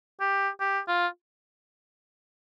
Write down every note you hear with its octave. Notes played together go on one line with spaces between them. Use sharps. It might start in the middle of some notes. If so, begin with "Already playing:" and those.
G4
G4
F4